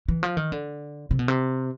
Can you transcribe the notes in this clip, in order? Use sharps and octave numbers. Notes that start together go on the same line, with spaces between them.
E3
F3
D#3
D3
C3
B2
C3